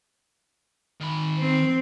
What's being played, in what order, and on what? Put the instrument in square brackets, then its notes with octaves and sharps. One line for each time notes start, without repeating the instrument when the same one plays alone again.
[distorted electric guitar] D#3 B5
[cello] C4